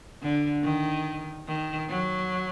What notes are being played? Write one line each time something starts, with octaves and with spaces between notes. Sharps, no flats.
D3
D#3
D#3
F#3